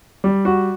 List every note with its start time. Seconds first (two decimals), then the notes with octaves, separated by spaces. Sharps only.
0.24 G3
0.45 F#4